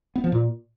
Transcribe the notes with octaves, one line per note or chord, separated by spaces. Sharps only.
B3
F3
A#2